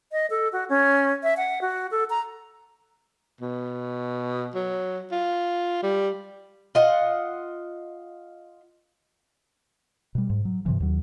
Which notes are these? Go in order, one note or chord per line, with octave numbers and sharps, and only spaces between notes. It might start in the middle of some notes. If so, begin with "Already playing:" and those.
D#5
A4
F#4
C#4
E5
F#5
F#4
A4
A#5
B2
F#3
F4
G3
F4 D#5 F#5
B2 G3
G#2
F#3
G2 C3 E3
D#2 F#3